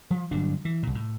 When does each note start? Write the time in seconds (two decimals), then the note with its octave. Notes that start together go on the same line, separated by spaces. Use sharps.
0.11 F3
0.31 G1 A#2 F#3 D4
0.65 E3
0.83 C2 A#2
0.95 A2